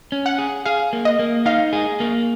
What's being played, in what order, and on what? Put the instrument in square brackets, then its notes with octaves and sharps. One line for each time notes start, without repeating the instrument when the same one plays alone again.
[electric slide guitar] C#4
[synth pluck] F#5
[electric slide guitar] G#4
[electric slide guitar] G#4 [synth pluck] F5
[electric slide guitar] A#3
[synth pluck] D#5
[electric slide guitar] A#3
[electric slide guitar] D#4 [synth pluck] F5
[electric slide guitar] G#4
A#3